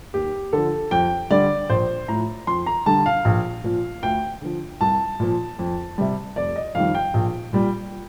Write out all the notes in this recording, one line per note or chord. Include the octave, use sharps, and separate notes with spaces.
D#2 G4
D3 F3 A4
F2 G5
D3 G3 D5
A#1 C5
A2 F3 A#5
F2 C6
A#5
D3 G3 A5
F5
A#1
A#2 F3
D2 G5
D3 F3
C2 A5
A#2 F3
F2
C3 G3
F1 D5
D#5
F2 D#3 G3 F5
G5
A#1
A#2 G3